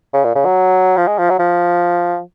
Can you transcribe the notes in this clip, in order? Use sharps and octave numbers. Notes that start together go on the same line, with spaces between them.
C#3
A#2
C#3
F#3
F3
G#3
F3
F#3
F3